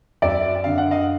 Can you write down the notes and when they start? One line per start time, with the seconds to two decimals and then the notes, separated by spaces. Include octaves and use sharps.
0.22 F#2 D5 E5
0.64 D3 F5
0.78 F#5
0.91 D#5 F5